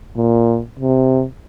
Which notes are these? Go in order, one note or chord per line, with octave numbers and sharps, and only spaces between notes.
A#2
C3